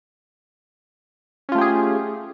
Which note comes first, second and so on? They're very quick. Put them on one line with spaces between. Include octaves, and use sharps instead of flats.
C#4 F4 A3 G4 G#4